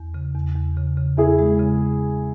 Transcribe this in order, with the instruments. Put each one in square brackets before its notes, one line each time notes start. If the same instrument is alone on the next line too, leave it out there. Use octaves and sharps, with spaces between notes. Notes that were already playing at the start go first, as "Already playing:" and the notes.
Already playing: [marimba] E2
C#3
E2
E2
C#3
C#3
[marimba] E2 [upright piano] E4 G#4
[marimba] G#3
C#3